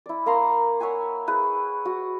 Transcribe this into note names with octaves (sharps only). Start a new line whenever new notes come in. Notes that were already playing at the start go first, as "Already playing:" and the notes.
E4 D5
A#3 A#4 A#5 C6
C#5 E5 F#5 G#5
E4 G#4 B4
F#4